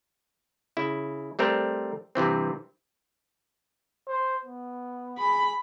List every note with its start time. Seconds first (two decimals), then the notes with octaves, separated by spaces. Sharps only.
0.77 C#3 E4
1.39 G3 A3 C4 A#4
2.15 G2 C3 E3 C4
4.07 C5
4.45 B3
5.19 G#4 B5